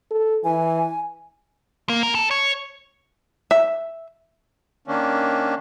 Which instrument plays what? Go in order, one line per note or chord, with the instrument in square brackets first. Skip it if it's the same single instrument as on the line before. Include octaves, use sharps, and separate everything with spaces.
[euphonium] A4
[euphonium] E3 [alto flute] G#5
[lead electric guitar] A#3
A#4
A4
C#5
[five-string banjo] E5
[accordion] D#3 A#3 C#4 D4